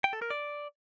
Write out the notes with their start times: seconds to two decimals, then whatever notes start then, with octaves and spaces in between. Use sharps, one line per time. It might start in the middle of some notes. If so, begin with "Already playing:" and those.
0.04 G5
0.13 A4
0.22 A#4
0.30 D5